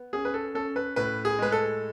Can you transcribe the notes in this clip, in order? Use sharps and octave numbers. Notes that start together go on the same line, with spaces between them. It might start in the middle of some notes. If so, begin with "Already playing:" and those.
Already playing: B3
C#4 G#4
B4
A4
C#4 A4
B4
A2 B4
G#4
G#3 B4
A4